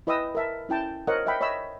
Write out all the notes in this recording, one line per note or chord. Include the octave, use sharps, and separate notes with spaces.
E4 B4 D#5 G5 D#6 E6
A#4 E5 A5
C#4 E4 G5 A5
A#4 C5 C#5 D#5 F#5
D#5 E5 F#5 G5 B5
C#5 D#5 E5 B5 E6